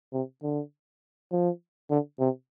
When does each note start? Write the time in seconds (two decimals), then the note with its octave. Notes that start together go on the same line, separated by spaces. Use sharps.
0.13 C3
0.43 D3
1.32 F3
1.90 D3
2.20 C3